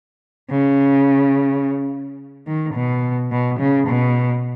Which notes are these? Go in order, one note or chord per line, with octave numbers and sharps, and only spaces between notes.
C#3
D#3
B2
B2
C#3
B2